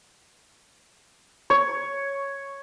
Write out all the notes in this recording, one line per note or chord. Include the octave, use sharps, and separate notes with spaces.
C#5